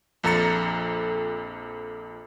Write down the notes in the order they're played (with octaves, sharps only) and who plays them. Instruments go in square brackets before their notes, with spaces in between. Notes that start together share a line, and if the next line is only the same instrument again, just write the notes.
[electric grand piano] A#1 F2 A4 A#5 A6 C#7